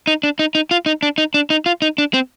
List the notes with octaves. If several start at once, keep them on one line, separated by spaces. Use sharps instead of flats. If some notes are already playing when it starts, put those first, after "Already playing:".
D#4
D4
D#4
D#4
F4
D#4
D4
D#4
D4
D#4
F4
D#4
D4
C4